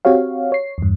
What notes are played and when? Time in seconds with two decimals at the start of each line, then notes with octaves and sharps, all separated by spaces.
0.05 C4 F#4 G4 C#5 F5
0.52 C#5 C7
0.78 E2 G2